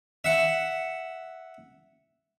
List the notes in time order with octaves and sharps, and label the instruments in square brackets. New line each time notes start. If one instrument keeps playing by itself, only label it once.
[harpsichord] E5 F#5